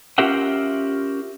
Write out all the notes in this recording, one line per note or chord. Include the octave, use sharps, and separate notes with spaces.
C#4 F4 G4 A#4 E5 F#5